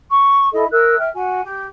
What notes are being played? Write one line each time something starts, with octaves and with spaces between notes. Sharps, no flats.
C#6
E4 A4 D#5
A#4 E5 E6 F#6
E5 G5 F6
F#4 G#5
G4